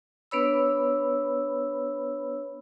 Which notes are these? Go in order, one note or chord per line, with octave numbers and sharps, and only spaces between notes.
B3 D4 B4 C#5 B5 E6